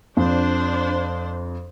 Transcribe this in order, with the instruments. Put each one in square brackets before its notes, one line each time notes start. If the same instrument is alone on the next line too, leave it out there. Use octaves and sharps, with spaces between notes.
[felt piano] F2 [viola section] D4 C5